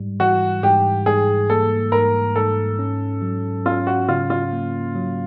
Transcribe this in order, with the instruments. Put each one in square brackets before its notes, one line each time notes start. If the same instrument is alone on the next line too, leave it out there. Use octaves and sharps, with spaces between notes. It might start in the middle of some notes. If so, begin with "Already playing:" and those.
Already playing: [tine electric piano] G#2 G3
[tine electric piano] E3 [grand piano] F#4
[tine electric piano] G#2 [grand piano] G4
[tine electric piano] G#2 [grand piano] G#4
[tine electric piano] A#3 [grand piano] A4
[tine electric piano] G#2 [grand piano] A#4
[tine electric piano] G#2 [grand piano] A4
[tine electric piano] C#4
F#3
[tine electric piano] C#4 [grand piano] F4
[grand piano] F#4
[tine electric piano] C#3 [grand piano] F4
[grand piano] F4
[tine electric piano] A#3
F#3